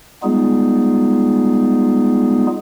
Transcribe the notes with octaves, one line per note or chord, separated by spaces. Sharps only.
G3 G#3 B3 D#4 F4 G#4